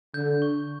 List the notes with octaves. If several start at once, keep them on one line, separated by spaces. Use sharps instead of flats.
D3 G6
C#6